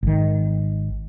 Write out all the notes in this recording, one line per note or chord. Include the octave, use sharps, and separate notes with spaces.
G#1 D#3